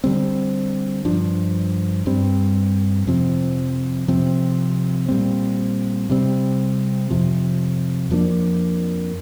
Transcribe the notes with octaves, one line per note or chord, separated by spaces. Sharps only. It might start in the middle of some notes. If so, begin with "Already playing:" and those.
D3 G3 C4
G2 F3 D4
G2 G3 C4
F2 C3 F3 C4
C3 F3 C4
A#2 G3 C4
C3 G3 C4
F2 C3 F3
F2 F3 A#3 D4